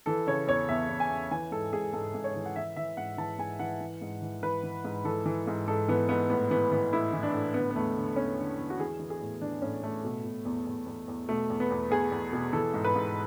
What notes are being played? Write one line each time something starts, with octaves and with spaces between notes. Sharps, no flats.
E3 A4
C#3 C#5
E2 C#5
E2 E5
E2
G#5
E2
E3 G#5
G#2 A4
G#2 G#4
G#2 A4
G#2
C#5
E3
F#5
E3 E5
E3 E5
G#2 F#5
E3 A5
G#2 G#5
E3 F#5
E3
G#2
E3
E3 B4
E3
G#2
E3 A4
E3
G#2
G#2 A4
E3 B3
G#2 B3
A2 B3
E3 B3
E3 B3
A2 E4
E3
D4
A2
D3 B3
B3
E2 A3
D3
E2 C#4
D3
E2
F#4
E3 G#4
E3
G#4
A2
E3 D4
A2 C#4
A2 A3
B2
B2
E2
E2
E2
E2
B2 A3
E2
B3
E2
E2 G#4
E2
B2
E3 A4
G#2
B4
G#2